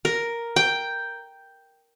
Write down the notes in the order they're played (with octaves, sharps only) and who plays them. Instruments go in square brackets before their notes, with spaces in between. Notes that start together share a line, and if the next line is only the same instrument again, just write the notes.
[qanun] A#4
G5